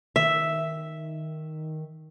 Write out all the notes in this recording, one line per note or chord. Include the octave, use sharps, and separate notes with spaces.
D#3 E5